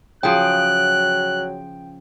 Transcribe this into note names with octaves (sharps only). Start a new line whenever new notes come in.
C#3 F3 F#3 G#4 G5 F#6